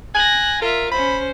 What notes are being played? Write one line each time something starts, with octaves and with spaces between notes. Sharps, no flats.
G#5 F#6 A#6
F4 A#4 E5
C#4 C5 B5